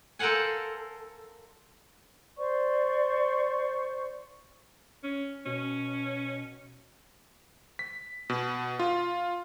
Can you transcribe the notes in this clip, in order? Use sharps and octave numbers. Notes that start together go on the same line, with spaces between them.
A4 A#4 C5 F5 F#5 G#5
C5 D5 C#6
C#4
B2 C#4
B6
B2
F4